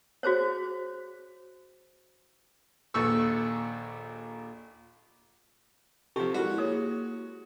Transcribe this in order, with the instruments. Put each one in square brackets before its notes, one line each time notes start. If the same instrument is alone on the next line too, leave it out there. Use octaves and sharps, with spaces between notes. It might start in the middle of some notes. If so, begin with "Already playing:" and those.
[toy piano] F#4 G#4 C5 C#5
[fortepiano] A#1 D#2 A4 C#6 E6
[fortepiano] C3 F3 [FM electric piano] G4 A4 C#6
[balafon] G#3 E4 A#4 [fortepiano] F#4
[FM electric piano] A#3 [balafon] G4 G#4 C#5